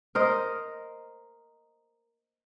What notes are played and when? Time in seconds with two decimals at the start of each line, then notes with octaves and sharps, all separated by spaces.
0.15 A#4 C5 D#5